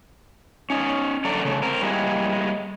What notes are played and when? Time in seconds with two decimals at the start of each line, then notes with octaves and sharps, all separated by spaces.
0.70 C#4 D#4
1.25 F#2 D3 C#4 A4 D5 A#5
1.45 C#3 A3
1.62 C4 A#4
1.82 G3 G#3 A#3 E4